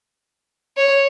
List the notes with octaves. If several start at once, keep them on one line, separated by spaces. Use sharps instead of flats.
C#5